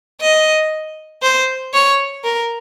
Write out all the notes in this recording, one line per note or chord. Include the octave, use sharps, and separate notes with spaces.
D#5
C5
C#5
A#4